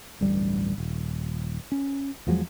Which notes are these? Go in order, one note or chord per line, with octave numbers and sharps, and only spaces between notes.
D1 A1 G2 G3
D#1
C#4
E2 F3 F#3 G#3